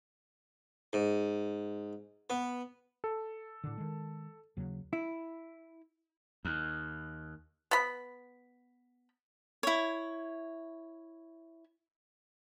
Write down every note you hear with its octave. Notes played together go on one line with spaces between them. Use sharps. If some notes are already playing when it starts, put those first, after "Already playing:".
G#2
B3
A4
A2 D3
D#3 G#3
D#2 C#3 F#3
E4
D#2
B3 B5
E4 C#5